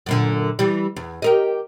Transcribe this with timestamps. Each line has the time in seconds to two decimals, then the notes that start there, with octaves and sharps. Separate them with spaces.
0.06 F#2 A#2 D3
0.59 E3 G3
0.96 E2
1.22 G4 A#4 D#5